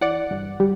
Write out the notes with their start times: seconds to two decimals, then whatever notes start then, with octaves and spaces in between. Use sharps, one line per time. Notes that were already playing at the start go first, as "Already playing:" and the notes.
0.01 E3 D5 F#5
0.31 G2
0.60 G3